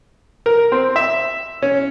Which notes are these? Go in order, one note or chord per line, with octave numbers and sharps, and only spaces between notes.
A#4
C4
E5
C#4